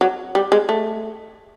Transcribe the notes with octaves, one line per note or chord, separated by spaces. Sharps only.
F#3
G3
G#3
A3